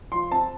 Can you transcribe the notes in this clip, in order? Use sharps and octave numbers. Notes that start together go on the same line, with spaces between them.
F3 C6
C4 A5